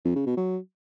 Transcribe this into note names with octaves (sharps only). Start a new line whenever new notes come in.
F2
C#3
B2
F#3